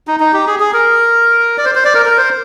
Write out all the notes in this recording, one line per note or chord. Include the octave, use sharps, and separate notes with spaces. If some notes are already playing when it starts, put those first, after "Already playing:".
D#4
D#4
G4
G#4
G#4
A#4
D5
C5
C5
D5
A#4
A#4
C5